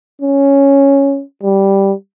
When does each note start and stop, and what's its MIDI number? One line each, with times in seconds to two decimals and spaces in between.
0.21 1.22 61
1.43 1.93 55